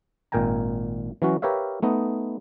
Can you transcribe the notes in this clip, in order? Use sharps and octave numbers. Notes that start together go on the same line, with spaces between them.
G#1 A#2 A#4 G5 G#5 A#5
E3 F#3 C#4 F#4
G4 A#4 B4 C#5 E5 F5
A3 B3 D#4 D#5